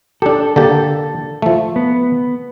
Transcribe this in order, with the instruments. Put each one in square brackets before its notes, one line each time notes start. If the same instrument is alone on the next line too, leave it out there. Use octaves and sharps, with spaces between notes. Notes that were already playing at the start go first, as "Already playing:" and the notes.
[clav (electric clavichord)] D4 G4 [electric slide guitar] A4
[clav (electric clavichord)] D3 A#3 G4 [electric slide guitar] A4
[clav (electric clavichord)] F3 A3
[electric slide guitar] B3